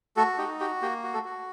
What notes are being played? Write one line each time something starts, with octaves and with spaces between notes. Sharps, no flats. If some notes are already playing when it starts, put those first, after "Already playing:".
A3 F#4 A4
D#4 G4
F#4 G4
A#3 G4
F#4
A3 A4
F#4